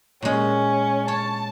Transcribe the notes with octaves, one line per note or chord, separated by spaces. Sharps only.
A#2 G#3 C#4
C#5 A5